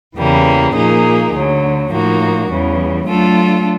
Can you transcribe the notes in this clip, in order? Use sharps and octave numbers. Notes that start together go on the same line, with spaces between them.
E2 C#3 E3 G3 A#3
A#2 F3 A#3 D#4 G#4
D2 D3 F#3
A2 F3 A#3 D#4 F#4
E2 C#3 E3 G3
F#3 A3 D4 F4 A4